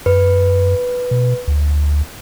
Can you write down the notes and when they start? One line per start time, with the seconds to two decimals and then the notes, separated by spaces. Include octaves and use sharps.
0.06 F#2 B4
1.11 B2
1.48 D2